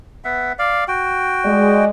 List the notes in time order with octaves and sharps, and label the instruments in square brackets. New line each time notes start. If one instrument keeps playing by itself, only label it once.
[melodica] B3 E5 F#5
D5 F5
F#4 G5
[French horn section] G#3 D5 D#5